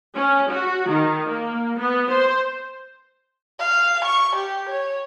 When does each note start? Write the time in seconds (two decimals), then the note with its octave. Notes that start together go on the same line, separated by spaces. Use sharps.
0.15 C#4
0.51 F#4
0.89 D#3
1.28 A#3
1.79 B3
2.11 C5
3.60 F5
4.05 C#6
4.36 G4
4.70 C#5